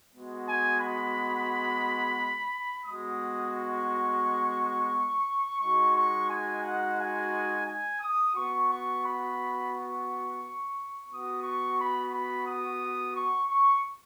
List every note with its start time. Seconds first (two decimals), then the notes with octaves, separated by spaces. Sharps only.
0.12 G#3 B3 F#4
0.47 G#5
0.80 B5
2.86 G#3 B3 F#4 D#6
3.55 C#6
5.60 G#3 D#4 F#4 C#6
5.95 C#6
6.29 G#5
6.63 F#5
6.98 G#5
7.66 G#5
8.00 D#6
8.34 B3 F#4 C#6
8.69 C#6
9.03 B5
9.72 C#6
11.09 B3 F#4 D#6
11.43 C#6
11.78 B5
12.12 B5
12.46 D#6
13.14 C#6
13.49 C#6